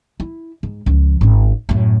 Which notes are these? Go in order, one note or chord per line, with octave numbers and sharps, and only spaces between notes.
E4
G#2
C#2 F3
G#1 C#4
F#2 A2